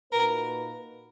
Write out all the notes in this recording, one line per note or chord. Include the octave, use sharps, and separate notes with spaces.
A#2 A#3 D#4 F#4 A#4 B4